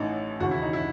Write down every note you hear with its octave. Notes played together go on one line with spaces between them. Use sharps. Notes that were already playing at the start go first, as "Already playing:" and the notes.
Already playing: A1 A2 E3 D#4
E1 D#2 C#3 E3 F#4
E4
D#4
E4